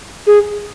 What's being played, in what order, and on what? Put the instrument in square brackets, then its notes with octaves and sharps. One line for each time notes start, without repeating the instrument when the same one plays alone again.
[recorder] G#4